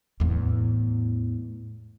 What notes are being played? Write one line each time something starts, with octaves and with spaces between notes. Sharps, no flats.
E2 A2